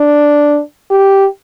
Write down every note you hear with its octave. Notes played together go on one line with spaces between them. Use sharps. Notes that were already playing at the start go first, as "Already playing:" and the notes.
Already playing: D4
G4